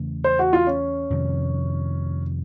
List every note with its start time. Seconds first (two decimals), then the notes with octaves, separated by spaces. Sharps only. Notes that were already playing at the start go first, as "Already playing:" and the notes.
Already playing: E2 C#3 E3 A3
0.24 C5
0.39 F#4
0.53 F4
0.67 C#4
1.10 F2 C3 D#3